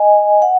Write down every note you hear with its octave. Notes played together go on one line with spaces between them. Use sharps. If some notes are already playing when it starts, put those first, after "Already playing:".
Already playing: D#5 G#5
F#5